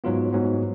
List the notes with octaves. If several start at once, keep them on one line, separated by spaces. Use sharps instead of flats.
G#2 F#3 B3 F4
G#2 F#3 B3